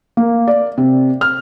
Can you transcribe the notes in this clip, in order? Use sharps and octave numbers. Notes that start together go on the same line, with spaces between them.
A#3
D5
C3
F6